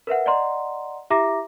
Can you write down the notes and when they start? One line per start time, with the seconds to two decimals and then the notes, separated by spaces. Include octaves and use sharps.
0.07 A#4 B4 E5 F#5
0.26 D5 D#5 F#5 A#5 C6
1.10 E4 G4 E5 A#5 D6 A#6